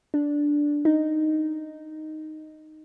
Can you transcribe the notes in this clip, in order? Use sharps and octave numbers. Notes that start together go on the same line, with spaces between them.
D4
D#4